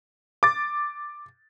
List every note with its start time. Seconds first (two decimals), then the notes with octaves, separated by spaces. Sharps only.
0.43 D6 A6